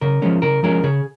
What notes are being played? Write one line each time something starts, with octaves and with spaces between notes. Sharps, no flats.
C#3 A#4
F3 G#3 C#4
C#3 A#4
F3 G#3 C#4 A#4
C#3 G#4